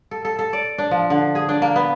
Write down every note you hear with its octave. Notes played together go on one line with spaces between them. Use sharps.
A4
A4
A4
D5
D4
F3
D3
G#4
D4
A#3
B3